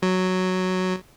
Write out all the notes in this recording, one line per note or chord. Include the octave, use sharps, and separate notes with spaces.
F#3